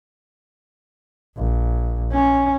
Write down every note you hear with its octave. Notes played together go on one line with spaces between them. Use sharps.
A#1
C#4